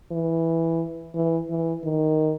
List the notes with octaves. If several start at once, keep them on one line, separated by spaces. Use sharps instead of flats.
E3
E3
E3
D#3